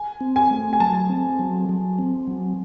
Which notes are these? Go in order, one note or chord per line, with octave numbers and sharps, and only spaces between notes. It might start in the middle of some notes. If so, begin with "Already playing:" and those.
Already playing: G#5
C4
G#5
A3
G#5
F#3 A5
C4
F#3
F#3
C4
F#3